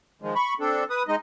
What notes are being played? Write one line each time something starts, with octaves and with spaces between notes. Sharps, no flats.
D#3 F3 G#3
B5 C#6
C4 D4 A4
B4 D#6
G#3 D#4 D#5